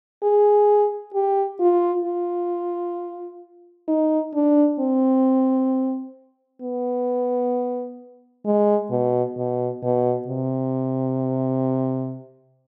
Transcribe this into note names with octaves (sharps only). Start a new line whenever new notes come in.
G#4
G4
F4
F4
D#4
D4
C4
B3
G#3
B2
B2
B2
C3